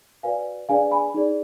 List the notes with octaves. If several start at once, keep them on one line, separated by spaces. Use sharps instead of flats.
F#4 B4 D5 F5 G#5
D4 G#4 B4 D5 F5 G#5
G#5 B5
D#4 G#4 D5